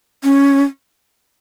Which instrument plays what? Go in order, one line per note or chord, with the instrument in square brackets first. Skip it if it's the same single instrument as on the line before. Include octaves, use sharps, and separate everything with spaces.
[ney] C#4